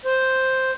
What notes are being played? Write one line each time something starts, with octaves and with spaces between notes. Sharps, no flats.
C5